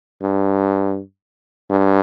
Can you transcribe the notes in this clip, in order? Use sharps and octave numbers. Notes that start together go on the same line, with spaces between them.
G2
G2